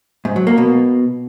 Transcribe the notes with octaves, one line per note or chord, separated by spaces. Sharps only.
G#2
F#3
A#3
B2